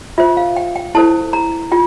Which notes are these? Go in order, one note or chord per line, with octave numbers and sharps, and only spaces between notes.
F4 C5 E5
F5
G5
G5
E4 A4 C5 A5
A#5
F4 G5